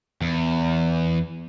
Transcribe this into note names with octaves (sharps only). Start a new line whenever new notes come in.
E2